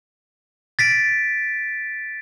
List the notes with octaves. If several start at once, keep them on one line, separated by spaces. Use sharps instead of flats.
A6 B6 D7